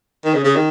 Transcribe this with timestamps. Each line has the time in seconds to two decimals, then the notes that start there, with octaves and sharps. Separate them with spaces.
0.25 D#3
0.34 C#3
0.44 C#3
0.55 D#3